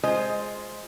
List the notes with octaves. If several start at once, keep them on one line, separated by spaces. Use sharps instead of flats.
G#3 F4 C5 D#5